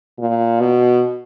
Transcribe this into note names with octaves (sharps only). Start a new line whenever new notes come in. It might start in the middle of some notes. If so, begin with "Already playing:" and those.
A#2
B2